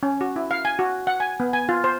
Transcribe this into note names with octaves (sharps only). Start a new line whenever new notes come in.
C#4
F#4
E4
F5
G#5
F#4
F#5
G#5
B3
G#5
F4
C5